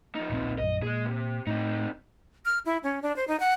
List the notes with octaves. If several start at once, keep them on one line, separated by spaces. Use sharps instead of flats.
F3 D#4
D1 A#1 C4
A#1 F#2 D#5
A#2 G#3 G#4
C3
A2 C4 D#4
F6
E4
C#4
D4
C5
D#4
F#5